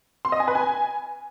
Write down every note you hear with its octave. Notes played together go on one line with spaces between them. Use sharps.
C6
D#5
G#5
B4
G#5